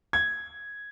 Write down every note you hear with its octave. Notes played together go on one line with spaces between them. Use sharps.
G#6